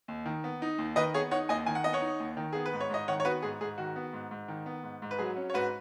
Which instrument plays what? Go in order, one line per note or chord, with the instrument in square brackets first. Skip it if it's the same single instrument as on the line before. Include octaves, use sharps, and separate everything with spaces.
[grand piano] D#2
D#3
B3
D#4
D#2
D#3 B4 D#5
B3 G#4 C#5
D#4 C#5 F#5
D#2 D#5 G#5
D#3 G#5
F#5
B3 D#5
C#5 F#5
D#4
D#2
D#3
B3 G#4
B4
G#2
C#5
G#2 D#5
D#3 C#5 F#5
C#5
B3 F#4 B4
G#2 G#4
G#2 G#4
D#3 F#4
B3
G#2
G#2
D#3
B3
G#2
G#2
B4
F#3 G#4
C#4
C#5
G#2 F#4 B4